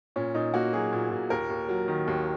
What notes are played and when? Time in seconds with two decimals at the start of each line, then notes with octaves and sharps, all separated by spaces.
0.16 A#2 C#4
0.35 A#2 D#4
0.54 A#3 F#4
0.73 F#3 G#4
0.92 A#2
1.11 A#2
1.30 D#2 A#4
1.50 D#2
1.69 F#3
1.88 D#3
2.07 D#2